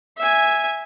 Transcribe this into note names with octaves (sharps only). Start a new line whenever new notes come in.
E5 G#5